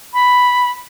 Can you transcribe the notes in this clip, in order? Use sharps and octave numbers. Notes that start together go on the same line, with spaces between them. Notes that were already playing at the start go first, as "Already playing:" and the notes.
B5